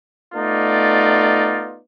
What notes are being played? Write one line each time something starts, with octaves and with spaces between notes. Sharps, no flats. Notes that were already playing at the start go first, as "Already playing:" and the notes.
A3 B3 D#4 F4 D5